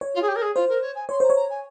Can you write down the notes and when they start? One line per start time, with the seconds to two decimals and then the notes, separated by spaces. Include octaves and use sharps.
0.01 C#5
0.15 F4
0.22 G#4
0.28 G4
0.36 A#4
0.42 G#4
0.55 F4 C5
0.69 A#4
0.82 C#5
0.95 G#5
1.09 C#5 C6
1.20 C5 A#5
1.30 C#5
1.36 A#5
1.50 G#5